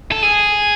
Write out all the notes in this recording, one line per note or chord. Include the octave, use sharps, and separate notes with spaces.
A4
G#4